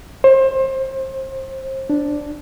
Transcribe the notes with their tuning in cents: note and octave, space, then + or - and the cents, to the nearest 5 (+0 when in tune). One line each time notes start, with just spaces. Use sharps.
C5 +30
D4 +0